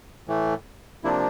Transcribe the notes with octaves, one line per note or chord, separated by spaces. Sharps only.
A2 E3 A3
C3 F3 A#3 D4 E4